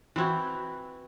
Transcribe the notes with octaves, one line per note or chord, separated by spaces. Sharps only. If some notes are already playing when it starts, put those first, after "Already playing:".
E3 C4 E4 F#4